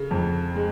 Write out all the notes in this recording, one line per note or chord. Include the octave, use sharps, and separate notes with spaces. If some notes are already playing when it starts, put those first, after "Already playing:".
Already playing: C#3
F2
G#3